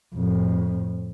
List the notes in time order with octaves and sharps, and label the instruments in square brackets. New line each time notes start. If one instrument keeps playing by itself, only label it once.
[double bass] F2 A2